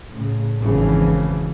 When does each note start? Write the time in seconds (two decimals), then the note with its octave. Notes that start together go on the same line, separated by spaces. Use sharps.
0.10 A2 C#3
0.60 G#1 F2 C#3 E3